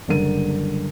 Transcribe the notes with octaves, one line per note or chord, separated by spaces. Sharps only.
F#1 D3 G3 A#4 D#7